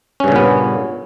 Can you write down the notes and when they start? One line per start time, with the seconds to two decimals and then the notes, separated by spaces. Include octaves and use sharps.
0.20 C#4
0.24 G2
0.28 C#3
0.32 A#2
0.36 B3